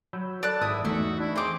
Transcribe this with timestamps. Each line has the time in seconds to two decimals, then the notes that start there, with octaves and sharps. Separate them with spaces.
0.13 F#3 B5 E6 G6
0.43 A4 D5 A5 F#6
0.61 G#1 E4 D#6
0.85 E2 E3 A3 D#4 F#4 E5
1.20 D4 E4
1.36 C4 G#4 D#5 D6